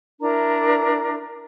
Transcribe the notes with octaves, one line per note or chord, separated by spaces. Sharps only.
D4 E4 A#4 A#5